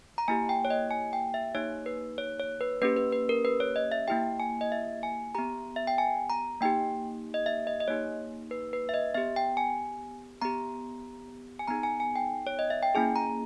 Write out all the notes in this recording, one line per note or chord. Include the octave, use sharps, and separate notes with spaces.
A#5
A#3 E4 G4 G#5
G5
C#5
D#5
G#5
G5
E5
A#3 D#4 G4 C#5
B4
C#5
C#5
B4
A#3 C#4 G4 B4
B4
B4
A#4
B4
C#5
D#5
E5
A#3 E4 G4 G5
G#5
D#5
E5
G#5
B3 G4 A#5
E5
G5
G#5
A#5
A#3 D#4 G4 G5
D#5
E5
D#5
D#5
A#3 D#4 G4 C#5
B4
B4
E5
D#5
B3 G4 E5
G5
G#5
B3 G4 A#5
G#5
B3 D#4 G#4 A#5
G#5
G#5
G5
C#5
D#5
E5
G5
A#3 C#4 E4 G#4 G#5
A#5